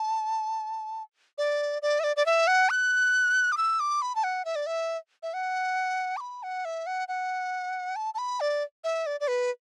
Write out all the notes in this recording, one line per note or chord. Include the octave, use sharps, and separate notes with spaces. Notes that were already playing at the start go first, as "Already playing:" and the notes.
Already playing: A5
D5
D5
E5
D5
D5
E5
F#5
F#6
D6
E6
D6
B5
A5
F#5
E5
D5
E5
E5
F#5
D6
B5
F#5
E5
F#5
F#5
A5
A5
B5
D5
E5
D5
D5
B4